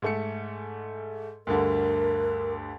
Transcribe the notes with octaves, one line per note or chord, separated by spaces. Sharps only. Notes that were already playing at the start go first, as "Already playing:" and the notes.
G#2 A3 C#7
D2 G2 D3 A#4